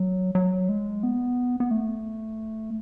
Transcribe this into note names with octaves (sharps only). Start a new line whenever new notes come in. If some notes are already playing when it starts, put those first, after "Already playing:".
Already playing: F#3
F#3
G#3
B3
B3
A3